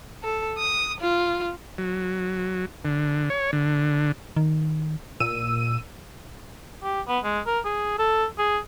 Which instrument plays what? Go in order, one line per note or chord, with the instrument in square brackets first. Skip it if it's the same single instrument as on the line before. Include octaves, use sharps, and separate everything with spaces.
[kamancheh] A4
D#6
F4
[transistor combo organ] F#3
D3
C#5
D3
[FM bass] D#3
[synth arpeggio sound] A#2 E6 D#7
[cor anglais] G4
B3
G#3
A#4
G#4
A4
G#4